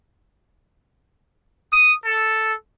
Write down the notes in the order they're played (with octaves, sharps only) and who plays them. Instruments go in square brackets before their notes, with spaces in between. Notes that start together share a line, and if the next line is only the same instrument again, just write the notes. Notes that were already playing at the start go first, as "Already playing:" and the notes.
[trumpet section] D#6
A4